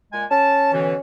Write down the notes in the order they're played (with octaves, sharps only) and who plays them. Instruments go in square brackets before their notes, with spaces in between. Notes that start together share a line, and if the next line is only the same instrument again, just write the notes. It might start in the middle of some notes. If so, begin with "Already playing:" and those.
[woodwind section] A#2 G#3 G#5
[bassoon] C#4 [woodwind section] A5
[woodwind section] B2 D3 E3